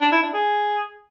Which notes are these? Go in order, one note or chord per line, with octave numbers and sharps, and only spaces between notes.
D4
E4
D4
G#4